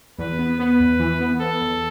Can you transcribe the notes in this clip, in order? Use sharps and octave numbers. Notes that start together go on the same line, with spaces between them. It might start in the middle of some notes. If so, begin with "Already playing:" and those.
E2 B4
B3
B3 B4
E2
E3
B3
B3 A4
E2